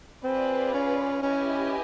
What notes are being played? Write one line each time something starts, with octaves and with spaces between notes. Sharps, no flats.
C4 F4 G#4 B4 D5
C#4
C#4 E4 G4 B4 D#5 G#5